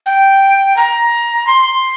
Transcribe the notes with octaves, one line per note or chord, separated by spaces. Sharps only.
G5
A#5
C6